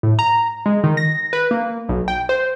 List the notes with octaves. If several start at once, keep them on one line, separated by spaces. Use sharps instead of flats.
A2
A#5
G#3
D#3
A#6
B4
A#3
B1
G5
C5